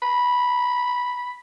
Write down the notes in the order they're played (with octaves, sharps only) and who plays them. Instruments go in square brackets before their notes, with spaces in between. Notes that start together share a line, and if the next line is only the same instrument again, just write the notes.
[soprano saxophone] B5